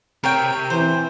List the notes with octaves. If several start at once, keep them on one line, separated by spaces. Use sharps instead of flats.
C3 A#4 C#5 G5
E3 C5